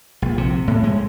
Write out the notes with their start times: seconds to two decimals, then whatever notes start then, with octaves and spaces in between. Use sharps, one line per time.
0.22 A#1
0.38 C3
0.68 A2
0.84 G#3